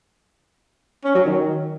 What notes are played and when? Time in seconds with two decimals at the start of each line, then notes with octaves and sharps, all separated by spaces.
1.05 C#4
1.15 F#3
1.25 D#3